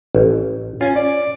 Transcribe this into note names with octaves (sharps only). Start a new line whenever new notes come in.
A1
C#4 F4
D5